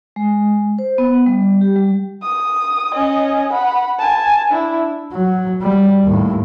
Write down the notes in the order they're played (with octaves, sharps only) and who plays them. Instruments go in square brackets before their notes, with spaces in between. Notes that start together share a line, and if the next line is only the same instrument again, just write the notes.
[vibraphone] G#3
C5
B3
G3
G4
G3
[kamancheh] D#6
C#4 D#5
F#5 B5
G#5 A5
D4 E4
[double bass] F#3
G3
D#2 A2